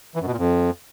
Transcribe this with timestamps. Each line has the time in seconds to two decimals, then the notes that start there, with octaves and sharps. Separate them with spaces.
0.16 E3
0.21 F#2
0.27 B2
0.32 A#2
0.38 F2